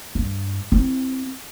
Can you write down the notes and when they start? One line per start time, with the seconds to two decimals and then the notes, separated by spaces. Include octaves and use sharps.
0.15 G2
0.72 C4 E4